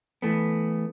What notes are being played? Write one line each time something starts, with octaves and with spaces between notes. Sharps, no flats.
E3 A3 B3